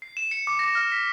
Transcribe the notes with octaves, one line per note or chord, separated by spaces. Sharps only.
C7
E7
C#7
D6
A#6
F6
B6